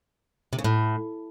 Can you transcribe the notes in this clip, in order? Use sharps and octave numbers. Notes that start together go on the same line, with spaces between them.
C3
C#3
A2